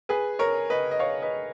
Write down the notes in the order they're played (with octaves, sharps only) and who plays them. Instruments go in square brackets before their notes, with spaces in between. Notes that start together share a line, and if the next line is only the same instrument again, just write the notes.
[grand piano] G#4 B4
A#4 C#5
B4 D#5
D#5
C#5 F5
B4 D#5